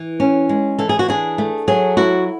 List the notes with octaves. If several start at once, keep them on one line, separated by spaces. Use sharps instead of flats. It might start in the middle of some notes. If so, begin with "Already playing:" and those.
Already playing: E3
C#4
G#3
E3 A4
G#4
F#4
D4 G#4
A3
F#3 G#4
E4 F#4